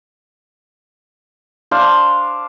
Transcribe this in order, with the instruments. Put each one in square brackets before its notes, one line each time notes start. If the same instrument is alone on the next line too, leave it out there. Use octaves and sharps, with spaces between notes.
[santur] D4 C5 F5